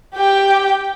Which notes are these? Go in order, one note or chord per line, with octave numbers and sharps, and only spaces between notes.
G4 G5